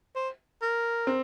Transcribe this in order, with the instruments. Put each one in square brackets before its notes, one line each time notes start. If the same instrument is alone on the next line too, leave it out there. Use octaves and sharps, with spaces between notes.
[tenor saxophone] C5
A#4
[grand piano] C4